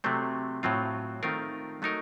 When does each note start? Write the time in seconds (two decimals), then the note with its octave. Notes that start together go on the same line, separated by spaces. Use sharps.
0.04 C3 F#3 A3 C4
0.63 A2 F#3 C4 F4
1.23 D#3 A3 C4 F4 A#4
1.82 F#3 A3 D#4 A#4